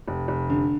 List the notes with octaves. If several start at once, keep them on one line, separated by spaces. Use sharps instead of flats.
F1
F1
D3